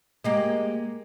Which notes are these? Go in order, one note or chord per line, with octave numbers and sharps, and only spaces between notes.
G#3 A#3 G4